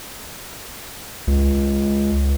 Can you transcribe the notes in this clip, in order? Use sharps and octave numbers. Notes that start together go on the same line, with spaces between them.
C#2